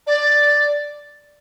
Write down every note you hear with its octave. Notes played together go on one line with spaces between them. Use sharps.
D5